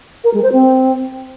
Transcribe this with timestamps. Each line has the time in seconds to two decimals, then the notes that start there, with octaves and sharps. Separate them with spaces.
0.24 A#4
0.33 G#3
0.42 C5
0.52 C4